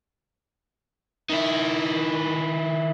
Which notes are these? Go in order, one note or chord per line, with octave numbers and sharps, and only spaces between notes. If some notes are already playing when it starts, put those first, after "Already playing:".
D#3 E4